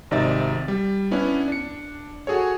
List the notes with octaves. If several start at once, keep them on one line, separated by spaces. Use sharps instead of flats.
G#1 C3 D#4 D5 E5 A6
G3
B3 C#4 D4 E4
D4 C#7
F#4 G#4 A4 C#5